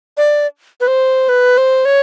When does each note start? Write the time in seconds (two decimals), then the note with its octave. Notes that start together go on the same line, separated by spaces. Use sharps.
0.17 D5
0.81 B4
0.87 C5
1.29 B4
1.58 C5
1.85 C#5